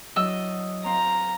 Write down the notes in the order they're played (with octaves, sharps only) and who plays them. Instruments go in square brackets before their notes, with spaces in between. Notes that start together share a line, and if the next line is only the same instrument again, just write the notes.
[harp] F#3 D4 E4 [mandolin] D#5 E6
[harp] C4 C5 F5 [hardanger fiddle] A#5